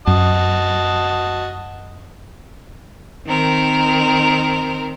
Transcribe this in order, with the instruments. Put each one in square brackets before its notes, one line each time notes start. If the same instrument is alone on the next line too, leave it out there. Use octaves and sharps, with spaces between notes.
[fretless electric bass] F#2 [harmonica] F#4 D#5 A5
[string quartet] D#3 C4 A#4